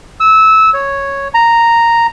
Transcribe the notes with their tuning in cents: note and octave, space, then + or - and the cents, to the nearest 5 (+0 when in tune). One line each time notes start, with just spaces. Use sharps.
E6 -20
C#5 -5
A#5 -5